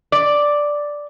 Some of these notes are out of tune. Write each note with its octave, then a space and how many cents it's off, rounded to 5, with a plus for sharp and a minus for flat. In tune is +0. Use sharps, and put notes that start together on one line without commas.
D5 +0